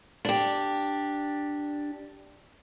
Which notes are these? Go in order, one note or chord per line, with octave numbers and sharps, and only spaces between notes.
D4 G4